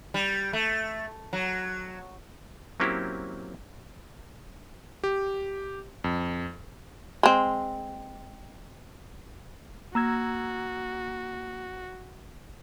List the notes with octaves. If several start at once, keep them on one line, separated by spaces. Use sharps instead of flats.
G3
A3
F#3
F#3 A#3 C4 C#4 E4 G4
G4
F2
G#3 C4
A#3 F#4 A#5 E6 G#6